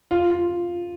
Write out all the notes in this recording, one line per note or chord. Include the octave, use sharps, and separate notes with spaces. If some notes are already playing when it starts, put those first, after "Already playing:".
F4
F4